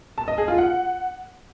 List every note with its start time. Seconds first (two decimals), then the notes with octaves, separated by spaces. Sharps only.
0.18 A5
0.28 D#5
0.38 G#4
0.48 F4
0.58 F#5